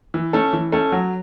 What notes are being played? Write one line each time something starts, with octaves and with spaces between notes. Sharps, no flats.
E3
A3 C#4 A4
E3
A3 C#4 A4
F#3